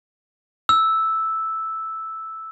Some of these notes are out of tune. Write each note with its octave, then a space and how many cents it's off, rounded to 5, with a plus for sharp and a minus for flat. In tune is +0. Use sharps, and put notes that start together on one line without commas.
E6 -5